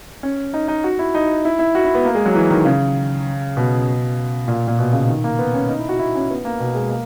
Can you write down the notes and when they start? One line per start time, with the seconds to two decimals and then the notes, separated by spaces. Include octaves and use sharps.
0.23 C#4
0.54 D#4
0.68 D#4
0.84 F#4
0.99 E4
1.14 D#4
1.45 E4
1.59 E4
1.75 F#4
1.85 E4
1.95 B3
2.05 A#3
2.15 G#3
2.26 F#3
2.35 E3
2.50 D#3
2.65 C#3
3.57 B2
4.48 A#2
4.68 A#2
4.79 B2
4.93 C#3
5.08 D#3
5.24 A#3
5.39 B3
5.54 C#4
5.69 D#4
5.79 E4
5.89 F#4
5.99 E4
6.15 C#4
6.30 B3
6.45 A#3
6.60 B2
6.75 G#3
6.90 A#3